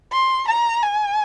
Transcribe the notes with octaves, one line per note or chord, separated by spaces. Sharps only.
C6
A#5
G#5